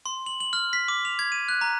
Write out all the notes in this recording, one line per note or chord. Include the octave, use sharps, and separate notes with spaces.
C6
F#7
F#7
F6
B6
D6
F7
G#6
D#7
F#6
A#5